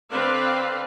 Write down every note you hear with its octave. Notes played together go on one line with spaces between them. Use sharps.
D3 C4 B4 C5 D5 F5